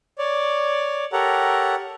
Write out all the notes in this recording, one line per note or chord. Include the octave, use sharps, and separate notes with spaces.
C#5 D5
G4 A4 A#4 C#5 F#5 A#5